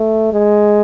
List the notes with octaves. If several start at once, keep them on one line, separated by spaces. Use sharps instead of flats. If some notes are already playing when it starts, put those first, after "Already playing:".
Already playing: A3
G#3